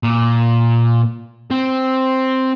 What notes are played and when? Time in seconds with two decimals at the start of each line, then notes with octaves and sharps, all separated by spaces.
0.03 A#2
1.51 C4